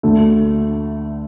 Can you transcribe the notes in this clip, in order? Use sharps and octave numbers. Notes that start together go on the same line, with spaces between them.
D2 D3 A3